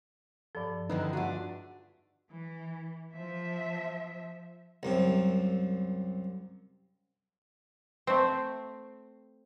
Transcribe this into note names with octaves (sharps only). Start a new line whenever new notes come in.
G2 F3 A4 D5
D3 D#3 D#4 E4 B4
D4 F4 F#4 G#4 E5
E3
F3 E5
C2 F#2 C3
A3 C4